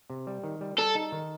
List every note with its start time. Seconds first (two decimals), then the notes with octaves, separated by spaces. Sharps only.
0.10 C3
0.27 G3
0.44 D#3
0.61 G3
0.78 G3 A4
0.95 D#4
1.12 D#3